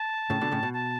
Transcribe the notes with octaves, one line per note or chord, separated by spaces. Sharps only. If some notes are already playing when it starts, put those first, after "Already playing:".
Already playing: A5
A2 C#3
B2 D3
A2 C#3
B2
A5